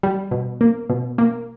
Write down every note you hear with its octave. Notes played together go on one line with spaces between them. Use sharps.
G3
B2
A#3
B2
A#3